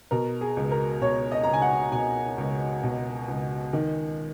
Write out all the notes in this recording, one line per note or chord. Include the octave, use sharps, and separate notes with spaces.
B2 A#4
G#4
C#2
A#4
B2 C#5
D#5
C#2 A#5
G#5
F#5
B2 G#5
C#2
B2
C#2
D#3